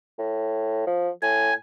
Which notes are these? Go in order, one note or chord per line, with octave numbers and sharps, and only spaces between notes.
A2
F3
A2 G#5